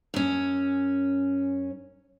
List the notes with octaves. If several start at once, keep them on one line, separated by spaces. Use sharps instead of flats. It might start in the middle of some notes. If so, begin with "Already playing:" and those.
F#2 C#4